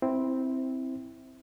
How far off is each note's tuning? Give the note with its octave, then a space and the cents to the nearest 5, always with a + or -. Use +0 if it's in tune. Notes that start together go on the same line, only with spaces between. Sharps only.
C4 +0 E4 -15